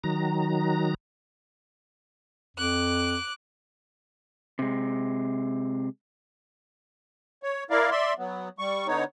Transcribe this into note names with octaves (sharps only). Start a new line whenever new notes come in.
D#3 F#3 A#5
F2 D6 F#6
C3 G#3
C#5
E4 A#4 D5 F5
D5 E5 C6
F#3 B3
G3 C#6
D3 B3 D#4 C#5